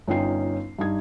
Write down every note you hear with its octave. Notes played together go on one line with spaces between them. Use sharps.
G1 C#4 D#4 F4 G5 C7
G2 G3 D#4 G#6